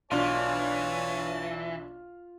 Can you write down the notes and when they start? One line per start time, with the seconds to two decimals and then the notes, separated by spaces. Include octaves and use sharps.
0.11 B1 E3 D4 F4 C#5 A5